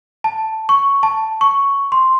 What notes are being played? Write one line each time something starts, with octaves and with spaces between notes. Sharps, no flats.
A5
C#6
A5
C#6
C6